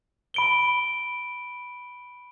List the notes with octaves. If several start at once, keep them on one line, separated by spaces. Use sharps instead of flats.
B5 D7 G7